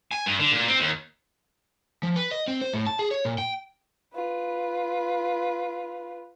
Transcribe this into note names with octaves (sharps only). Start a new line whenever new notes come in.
G#5
G2
D3
A#2
C4
D#2
F3
B4
D#5
C4
C5
A2
A5
G#4
C#5
A#2
G5
F4 B4